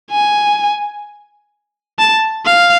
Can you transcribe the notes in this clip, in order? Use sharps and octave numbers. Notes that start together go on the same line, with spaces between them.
G#5
A5
F5